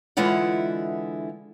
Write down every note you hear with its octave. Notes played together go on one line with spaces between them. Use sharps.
D3 E3 G#3 E4 F4 F#5